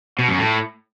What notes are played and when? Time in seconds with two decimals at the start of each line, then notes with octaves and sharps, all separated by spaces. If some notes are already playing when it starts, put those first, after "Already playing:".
0.19 B2
0.29 F#2
0.39 A2